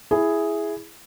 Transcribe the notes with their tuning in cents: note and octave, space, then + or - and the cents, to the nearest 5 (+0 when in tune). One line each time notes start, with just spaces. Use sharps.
E4 +5 G#4 +0